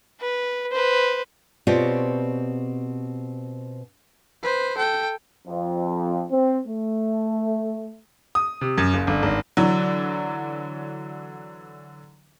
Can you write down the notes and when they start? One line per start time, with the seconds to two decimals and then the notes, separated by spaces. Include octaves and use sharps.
0.20 B4
0.72 B4 C5
1.67 B2 C4 F4 G4 C#5 D5
4.43 B4 C5
4.77 A4 G5
5.47 F2
6.30 C4
6.67 A3
8.35 D#6
8.61 C3
8.78 F#2
8.93 F#1
9.07 G1
9.23 G#1
9.57 D3 E3 F#3